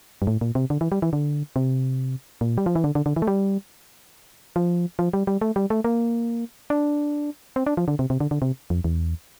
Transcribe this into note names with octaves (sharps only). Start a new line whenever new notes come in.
G2
A2
A#2
C3
D3
E3
G3
E3
D3
C3
A#2
G3
F3
E3
D3
D3
D3
E3
A3
G3
F3
F3
G3
G3
A3
G3
A3
A#3
D4
C4
D4
F3
D3
C3
C3
D3
D3
C3
F2
E2